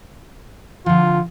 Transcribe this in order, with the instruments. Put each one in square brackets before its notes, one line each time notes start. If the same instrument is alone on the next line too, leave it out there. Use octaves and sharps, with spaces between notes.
[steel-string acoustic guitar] D3 F3 [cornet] F4